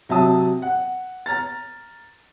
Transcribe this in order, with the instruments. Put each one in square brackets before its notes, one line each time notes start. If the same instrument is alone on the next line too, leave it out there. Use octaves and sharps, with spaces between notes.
[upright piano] C3 F#3 E5 A5 D#6
F#5
A#5 F6 A6